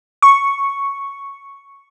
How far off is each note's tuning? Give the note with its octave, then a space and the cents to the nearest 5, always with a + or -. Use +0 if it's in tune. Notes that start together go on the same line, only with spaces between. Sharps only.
C#6 +0